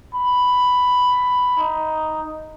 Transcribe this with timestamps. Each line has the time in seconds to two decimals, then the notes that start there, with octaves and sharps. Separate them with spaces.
0.15 B5
1.58 D#4